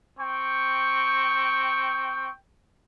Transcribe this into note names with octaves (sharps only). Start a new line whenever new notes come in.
C4 G5 C#6